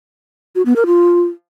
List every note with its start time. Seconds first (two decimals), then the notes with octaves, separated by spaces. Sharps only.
0.55 F#4
0.66 B3
0.76 A#4
0.86 F4